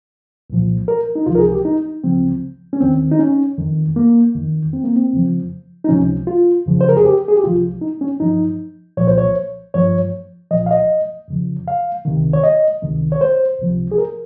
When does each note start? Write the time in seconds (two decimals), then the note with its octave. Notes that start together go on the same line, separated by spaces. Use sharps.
0.50 C2 A#2 F3
0.88 A#4
1.15 D#4
1.26 C#2 C3 F3 F4
1.35 A#4
1.39 G#4
1.52 G4
1.65 D#4
2.04 C#2 C#3 F3 C4
2.73 C#4
2.80 D#2 D#3 C4
3.11 D#4
3.19 C#4
3.58 F2 D#3
3.96 A#3
4.35 F2 D#3
4.73 C4
4.84 A#3
4.96 C4
5.12 F2 C#3 F3
5.84 D#4
5.89 C#2 C3 F3 C#4
6.27 F4
6.66 F2 C#3 F3
6.81 C5
6.89 A#4
6.97 G#4
7.05 G4
7.28 G#4
7.36 G4
7.43 C2 C3 F3 F4
7.81 D#4
8.01 C#4
8.20 G2 F3 D#4
8.97 C2 A#2 F3 C#5
9.07 C5
9.18 C#5
9.74 G2 F3 C#5
10.51 C2 A#2 F3 D#5
10.66 F5
10.71 D#5
11.28 F2 C#3 F3
11.68 F5
12.05 C#2 C3 D#3
12.33 C#5
12.44 D#5
12.82 C#2 C3 D#3
13.12 C#5
13.21 C5
13.59 C#2 C3 F3
13.92 G#4
13.98 A#4